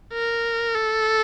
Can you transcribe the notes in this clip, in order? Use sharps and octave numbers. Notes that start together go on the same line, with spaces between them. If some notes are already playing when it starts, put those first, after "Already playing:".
A#4
A4